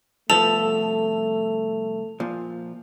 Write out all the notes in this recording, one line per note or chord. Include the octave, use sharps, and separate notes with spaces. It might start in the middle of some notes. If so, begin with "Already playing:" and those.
C2 F3 A3 B3 A4 F7
A#2 F3